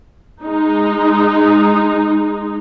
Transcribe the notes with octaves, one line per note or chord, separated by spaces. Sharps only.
G#3 D#4